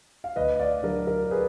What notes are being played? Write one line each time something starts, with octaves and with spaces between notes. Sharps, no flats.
F5
D2 B4 D#5
D5 F5
D3 F#3 A#4
A#4
G#4 B4